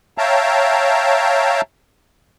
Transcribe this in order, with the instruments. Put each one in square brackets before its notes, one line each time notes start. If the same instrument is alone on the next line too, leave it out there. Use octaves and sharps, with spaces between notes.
[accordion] C#5 E5 F5 G5 A5 A#5